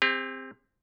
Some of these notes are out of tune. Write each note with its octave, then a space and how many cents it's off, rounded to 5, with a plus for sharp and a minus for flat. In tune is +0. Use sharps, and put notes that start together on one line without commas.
C4 +0 G4 +45